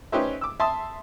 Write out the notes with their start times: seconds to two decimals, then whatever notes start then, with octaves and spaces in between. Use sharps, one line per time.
0.12 C#4 D#4 G4 B4 C5 E5
0.41 D6 E6
0.60 E5 A5 C6 D#6